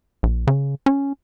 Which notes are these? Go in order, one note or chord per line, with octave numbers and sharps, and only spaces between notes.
A#1
C#3
C#4